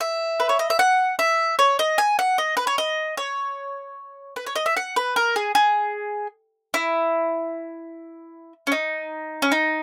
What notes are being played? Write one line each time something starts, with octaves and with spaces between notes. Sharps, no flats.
E5
B4
C#5
D#5
E5
F#5
E5
C#5
D#5
G#5
F#5
D#5
B4
C#5
D#5
C#5
B4
C#5
D#5
E5
F#5
B4
A#4
G#4
G#4
E4
C#4
D#4
C#4
D#4